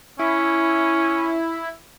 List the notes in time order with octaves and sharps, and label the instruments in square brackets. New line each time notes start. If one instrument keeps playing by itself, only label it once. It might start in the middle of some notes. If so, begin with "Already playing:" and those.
[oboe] C#4 [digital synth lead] E4